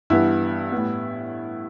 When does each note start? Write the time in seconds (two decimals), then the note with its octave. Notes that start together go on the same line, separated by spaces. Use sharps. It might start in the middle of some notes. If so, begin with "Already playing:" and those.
0.10 G2 E3 B3 E4
0.72 A2 G3 B3